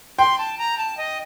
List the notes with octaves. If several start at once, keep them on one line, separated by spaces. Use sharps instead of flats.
G5 C6
A5
A#5
A5
D#5